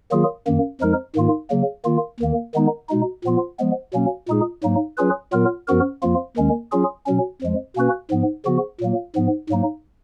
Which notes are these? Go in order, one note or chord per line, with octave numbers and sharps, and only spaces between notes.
D#3 F#3 A#3 F4 G#4
F#2 D#3 A#3
F2 F3 G#3 D#4 A#4
G#2 D#3 A#3 F4
C#3 F#3 A#3
D#3 A#3 F4
D#2 D#3 A#3
D#3 G#3 B3 D#4
B2 G#3 D#4
A#2 F3 B3 F4
F3 G#3 B3
B2 F#3 A#3 C#4
A#2 G#3 D#4 G#4
G#2 F#3 A#3 D#4
F#3 C#4 F4 G#4 B4
A#2 F#3 B3 F4 A#4
F#2 F3 B3 F#4 A#4
F2 F3 A#3 F4
D#2 D#3 G#3 C#4
F#3 C#4 F4 G#4
B2 F#3 C#4
F2 F3 G#3
B2 A#3 C#4 F#4 B4
G#2 F3 B3
C#3 F3 B3 F#4
A#2 F#3 A#3
G#2 F3 B3
G#2 F#3 A#3 D#4